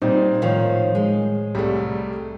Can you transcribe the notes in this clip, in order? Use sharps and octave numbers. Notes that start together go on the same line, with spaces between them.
A#2 G3 C4 D#4
A2 D#3 F3 C#5 F5
G#3
C2 G3 A3